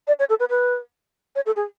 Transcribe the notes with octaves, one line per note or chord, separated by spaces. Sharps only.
D5
C#5
A4
B4
B4
C#5
A4
G#4